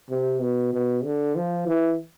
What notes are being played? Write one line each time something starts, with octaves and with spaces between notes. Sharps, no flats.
C3
B2
B2
D3
F3
E3